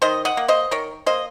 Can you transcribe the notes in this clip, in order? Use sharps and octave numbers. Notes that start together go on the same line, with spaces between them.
D#3 C5 D#5
D#5 F#5
A#3
C5 D#5
D#3 A#4 C#5
A#3 C5 D#5